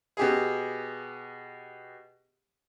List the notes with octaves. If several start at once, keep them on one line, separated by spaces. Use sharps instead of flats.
B2 G4 G#4